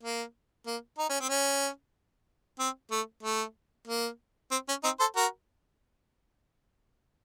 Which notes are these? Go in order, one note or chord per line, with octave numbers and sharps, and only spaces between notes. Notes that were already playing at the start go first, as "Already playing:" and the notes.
A#3
A#3
D#4
C#4
C4
C#4
C4
A3
A3
A#3
C4
C#4
C4 D#4
A4 C5
F#4 A#4